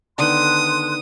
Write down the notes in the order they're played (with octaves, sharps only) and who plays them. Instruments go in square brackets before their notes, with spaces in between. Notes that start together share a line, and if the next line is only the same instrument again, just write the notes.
[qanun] D3 D#3 B3 [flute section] A4 C6 F#6 [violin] D#6